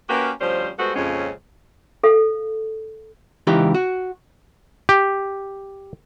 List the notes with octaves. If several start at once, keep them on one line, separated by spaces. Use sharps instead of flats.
A#3 C#4 F#4 G4 A#4 B4
D2 F3 G3 C#4 C5
G3 G#3 B3 F#4 A4 C5
F2 A#2 C#3 G#3 C4 C#4
A4 F5
C#2 E3 D#4 G4
F#4
G4